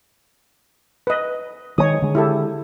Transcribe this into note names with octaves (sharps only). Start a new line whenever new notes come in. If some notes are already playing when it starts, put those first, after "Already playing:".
B4 D#5
D#3 F3 G#3 C#5 D#6
D3 G#3
E4 G4 A4